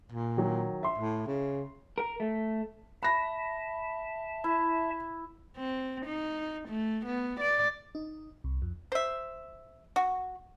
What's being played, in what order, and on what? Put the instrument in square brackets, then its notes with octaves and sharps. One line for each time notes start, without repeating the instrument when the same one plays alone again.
[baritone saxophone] A#2
[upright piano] D#3 F#3
E5 C6
[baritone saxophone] A2
C#3
[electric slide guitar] A#4
A3
[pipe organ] E5 A5 [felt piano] B5 A#6
[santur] E4
[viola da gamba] C4
D#4
A3
B3
D5
[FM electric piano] D#4
C2
F2
[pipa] C5 E5
F#4